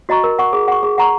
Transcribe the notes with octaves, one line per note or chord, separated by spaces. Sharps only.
F#4 D#5 A#5 C#6
A#4
F#5 C#6
G#4
F#5 C#6
G#4
F#5 A#5 C#6